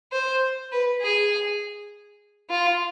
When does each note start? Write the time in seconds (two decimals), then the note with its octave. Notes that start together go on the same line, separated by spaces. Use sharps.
0.12 C5
0.72 B4
1.01 G#4
2.50 F4